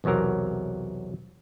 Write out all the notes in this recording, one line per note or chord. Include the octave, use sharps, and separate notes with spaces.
B1 E2 C3 F#3 A#4